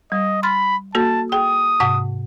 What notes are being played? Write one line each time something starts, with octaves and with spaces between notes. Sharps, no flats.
G3 D#5
B5 C6 F6 A6
A#3 F#4 A4 A5
G#4 G5 D#6
G#2 C3 F#5